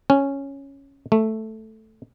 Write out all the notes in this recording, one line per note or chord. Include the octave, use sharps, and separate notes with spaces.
C#4
A3